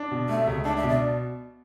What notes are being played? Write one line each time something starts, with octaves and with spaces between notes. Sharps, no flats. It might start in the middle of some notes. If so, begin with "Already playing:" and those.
Already playing: D4
B2
A3 E5
C#2
D4 A5
E5
B2
D5